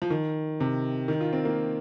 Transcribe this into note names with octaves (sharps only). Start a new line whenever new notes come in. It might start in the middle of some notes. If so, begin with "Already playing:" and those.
F3
D#3
C3
D#3
F4
C4
A#3